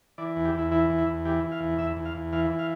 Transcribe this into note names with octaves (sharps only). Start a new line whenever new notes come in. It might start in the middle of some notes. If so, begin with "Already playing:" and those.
E3 D5
E2
G4
E2 E4
E3 E4
E2
E4
E2
E3 G4
E3
F5
E2
E2 E5
E2
F5
E2
E3 F5
E3
F5